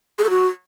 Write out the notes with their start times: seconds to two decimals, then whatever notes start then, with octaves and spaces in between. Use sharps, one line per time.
0.19 G#4
0.24 A4
0.30 F#4